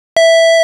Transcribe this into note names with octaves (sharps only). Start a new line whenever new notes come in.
E5